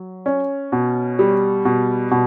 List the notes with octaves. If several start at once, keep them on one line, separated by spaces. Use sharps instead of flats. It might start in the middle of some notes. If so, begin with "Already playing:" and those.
Already playing: F#3
C#4
B2
G3
B2
B2